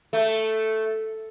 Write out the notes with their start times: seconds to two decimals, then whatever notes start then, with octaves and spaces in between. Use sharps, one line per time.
0.13 A3